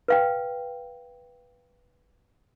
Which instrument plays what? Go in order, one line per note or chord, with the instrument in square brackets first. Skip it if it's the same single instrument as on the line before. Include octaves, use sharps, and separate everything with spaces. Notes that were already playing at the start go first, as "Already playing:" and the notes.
[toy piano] B4 F5 G5